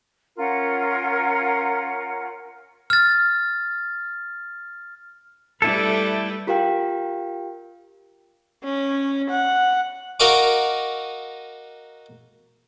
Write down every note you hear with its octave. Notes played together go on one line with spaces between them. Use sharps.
C#4 F4 A#4 F#5
F6 A6
G3 A3 E4 A4 B4
F4 G4 A#4 F5 G5
C#4
F#5
D#4 F#4 A#4 D#5 F5 D6